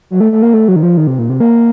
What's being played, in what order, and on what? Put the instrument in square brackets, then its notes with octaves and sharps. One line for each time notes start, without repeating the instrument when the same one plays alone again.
[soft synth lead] F#3
A3
A3
A#3
A3
F#3
D#3
F3
D#3
C3
A#2
C3
A#3